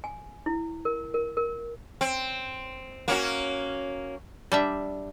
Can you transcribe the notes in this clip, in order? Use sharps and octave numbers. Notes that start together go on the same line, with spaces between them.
G#5
E4
A#4
A#4
A#4
C4
A#3 C#4 F#4
G3 D4 E5